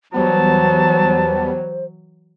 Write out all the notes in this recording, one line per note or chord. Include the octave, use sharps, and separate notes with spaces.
E2 E3 F#3 G3 B3 C5 A5